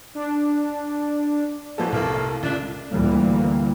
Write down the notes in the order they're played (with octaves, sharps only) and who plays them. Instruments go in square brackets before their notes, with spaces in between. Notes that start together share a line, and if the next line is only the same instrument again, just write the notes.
[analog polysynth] D4
[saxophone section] F#2 B2 E3 [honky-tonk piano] F3 A4
[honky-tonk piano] C2 [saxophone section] G2 A3 A#3
[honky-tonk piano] C#2 [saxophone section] A3 D4
[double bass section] D2 A#2 E3 G3 A#3